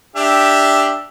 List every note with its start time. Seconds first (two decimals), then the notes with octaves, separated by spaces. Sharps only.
0.16 D4 G4 E5